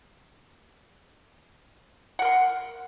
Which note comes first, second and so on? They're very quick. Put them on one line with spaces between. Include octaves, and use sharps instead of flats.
F#5 A#4 C6